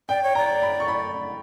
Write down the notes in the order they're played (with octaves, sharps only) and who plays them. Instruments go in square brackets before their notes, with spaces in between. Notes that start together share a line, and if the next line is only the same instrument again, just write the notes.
[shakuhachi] D5 [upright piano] G5
[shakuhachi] C#5
[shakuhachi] D5 [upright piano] A#5
[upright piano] B5
C#6
B5